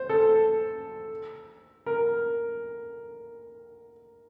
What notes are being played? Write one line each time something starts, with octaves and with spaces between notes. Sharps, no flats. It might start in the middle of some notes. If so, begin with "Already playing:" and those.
Already playing: C5
A4
A#4